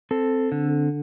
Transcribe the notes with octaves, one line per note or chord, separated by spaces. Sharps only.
C4 A4
D3